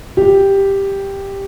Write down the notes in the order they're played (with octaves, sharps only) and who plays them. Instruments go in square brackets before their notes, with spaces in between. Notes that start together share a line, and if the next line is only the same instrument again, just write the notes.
[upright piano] G4